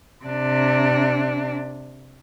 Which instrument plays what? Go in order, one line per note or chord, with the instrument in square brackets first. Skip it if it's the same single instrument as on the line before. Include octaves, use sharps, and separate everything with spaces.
[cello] C3 D4